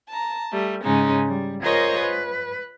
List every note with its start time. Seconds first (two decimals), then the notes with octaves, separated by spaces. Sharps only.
0.10 A5 A#5
0.53 G3 A3
0.84 G#2 C#3 G#3 C#4 D#4
1.27 G3
1.61 F4 G#4 A#4 C5 C#5 D#5
2.00 B4